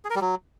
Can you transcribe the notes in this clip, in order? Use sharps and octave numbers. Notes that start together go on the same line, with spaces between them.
G#4
A#4
G3
F#3